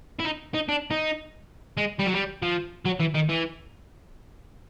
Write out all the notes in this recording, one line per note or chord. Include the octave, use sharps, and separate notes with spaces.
E4
D#4
D#4
D4
D#4
G#3
G3
F#3
G3
F3
F#3
E3
D#3
E3